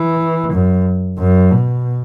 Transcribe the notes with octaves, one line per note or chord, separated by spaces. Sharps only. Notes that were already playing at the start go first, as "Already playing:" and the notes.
Already playing: E3
F#2
F#2
B2